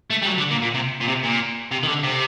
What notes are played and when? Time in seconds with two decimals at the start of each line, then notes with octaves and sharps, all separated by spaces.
0.10 A3
0.22 G3
0.26 F#3
0.38 D3
0.51 A#2
0.62 A#2
0.74 C3
1.00 A#2
1.07 C3
1.23 A#2
1.71 C3
1.83 D#3
1.88 D3
2.03 C3